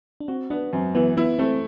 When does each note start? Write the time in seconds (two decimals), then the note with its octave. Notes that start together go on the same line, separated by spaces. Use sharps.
0.20 D4
0.28 C4 F#4
0.50 B3 D4
0.73 F#2 C4
0.95 E3 B3
1.17 B3 E4
1.39 A3 C4